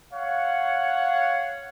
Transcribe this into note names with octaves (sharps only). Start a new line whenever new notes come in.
C#5 F5 F#5